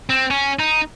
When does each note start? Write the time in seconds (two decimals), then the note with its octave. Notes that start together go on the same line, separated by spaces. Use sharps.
0.10 C4
0.31 C#4
0.59 D#4